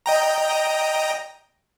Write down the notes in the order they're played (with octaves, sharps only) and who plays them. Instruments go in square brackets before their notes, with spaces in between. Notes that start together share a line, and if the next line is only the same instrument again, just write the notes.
[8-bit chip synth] D#5 G5 A#5